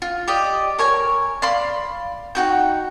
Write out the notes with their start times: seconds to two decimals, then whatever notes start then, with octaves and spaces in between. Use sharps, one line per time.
0.02 F4
0.28 G4 D5 D#5
0.79 A#4 C#5 G#5
1.42 D5 F5 B5 C6
2.35 D#4 F#4 G5